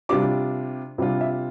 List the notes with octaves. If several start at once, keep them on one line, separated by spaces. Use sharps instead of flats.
C3 G3 D4 F4 D6
C3 G3 D4 F4
E5